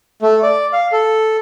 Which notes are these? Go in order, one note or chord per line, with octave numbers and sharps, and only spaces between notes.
A3
D5
F5
A4